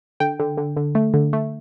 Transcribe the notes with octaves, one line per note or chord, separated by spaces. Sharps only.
D3 G5
D3
D3
D3
A3
D3
A3